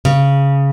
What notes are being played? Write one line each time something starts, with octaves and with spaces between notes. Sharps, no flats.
C#3